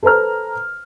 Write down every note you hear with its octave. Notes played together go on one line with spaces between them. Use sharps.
A4 B4 C5 A#5 F6